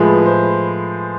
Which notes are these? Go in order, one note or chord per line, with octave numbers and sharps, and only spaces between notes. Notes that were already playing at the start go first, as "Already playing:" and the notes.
Already playing: A2 F3 G#3 B4
C5